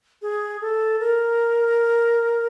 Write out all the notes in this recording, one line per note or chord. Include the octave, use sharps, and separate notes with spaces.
G#4
A4
A#4